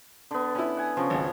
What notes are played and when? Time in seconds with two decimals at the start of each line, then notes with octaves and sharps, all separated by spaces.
0.31 D3 B3
0.55 C#4 E4
0.77 F#5 G#5
0.97 C#3 F3 C#5
1.10 G#1 C#2